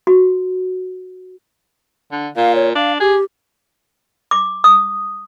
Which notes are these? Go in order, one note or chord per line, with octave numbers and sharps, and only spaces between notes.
F#4
D3
A#2 F5
C#5
D4 F5
G4 G#4
D6
D#6